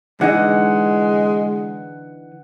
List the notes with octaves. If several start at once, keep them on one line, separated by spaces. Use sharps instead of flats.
D3 E3 G#3 D#4 F#5